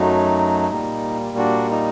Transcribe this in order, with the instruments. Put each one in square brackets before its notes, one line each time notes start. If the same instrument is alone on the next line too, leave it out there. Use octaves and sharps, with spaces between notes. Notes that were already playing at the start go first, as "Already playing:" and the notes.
Already playing: [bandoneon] F#2 F#3 A3 D#4
A#2 G3 A#3
D4 F#4
D#4